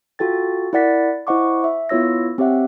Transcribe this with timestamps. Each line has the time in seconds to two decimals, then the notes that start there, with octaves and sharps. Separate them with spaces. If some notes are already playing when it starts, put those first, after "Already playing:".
0.19 F4 F#4 A4 G5 A6
0.73 E4 A#4 D5 F#5 A6 B6
1.27 E4 C5 D#5 F#5 C#6 D6
1.64 E5
1.89 B3 E4 F4 C#5 E6 A#6
2.38 C4 G4 C#5 E5 F#5